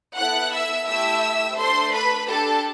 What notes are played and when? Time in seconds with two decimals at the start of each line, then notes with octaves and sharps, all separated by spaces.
0.18 B3 E4 A4 F#5 F#6
0.53 E5 E6
0.88 A3 E4 G4 E5 E6
1.58 A3 D4 A4 C5 C6
1.93 B4 B5
2.28 D4 G4 A4 A5